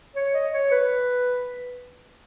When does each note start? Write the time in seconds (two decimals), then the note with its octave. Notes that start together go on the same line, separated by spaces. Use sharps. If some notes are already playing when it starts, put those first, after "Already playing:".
0.16 C#5
0.34 D#5
0.53 C#5
0.71 B4